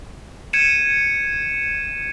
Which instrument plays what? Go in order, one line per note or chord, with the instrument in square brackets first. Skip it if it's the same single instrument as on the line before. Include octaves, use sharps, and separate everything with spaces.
[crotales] G#6 C#7 D#7 E7